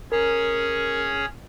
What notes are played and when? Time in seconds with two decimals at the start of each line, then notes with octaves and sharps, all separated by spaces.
0.12 C#4 G#4 A#4 C#5